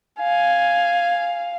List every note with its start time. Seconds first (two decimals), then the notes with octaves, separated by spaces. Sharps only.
0.19 F5 G#5